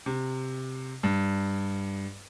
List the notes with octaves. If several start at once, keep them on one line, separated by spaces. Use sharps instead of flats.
C3
G2